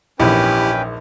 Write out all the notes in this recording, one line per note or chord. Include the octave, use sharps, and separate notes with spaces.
A#1 E2 G#2 C#4 E4 G4 B4 G5